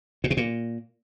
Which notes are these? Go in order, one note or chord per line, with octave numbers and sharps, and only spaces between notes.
A#2
B2
A#2